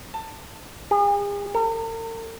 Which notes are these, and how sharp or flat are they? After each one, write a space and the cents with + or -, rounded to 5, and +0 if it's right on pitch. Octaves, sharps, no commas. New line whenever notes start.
A5 +20
G#4 -40
A#4 -45